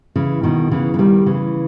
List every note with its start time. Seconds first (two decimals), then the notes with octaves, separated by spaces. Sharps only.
0.16 C#3 E3
0.43 B2 D#3
0.71 C#3 E3
0.94 E3
0.99 D#3 G3
1.26 C#3 E3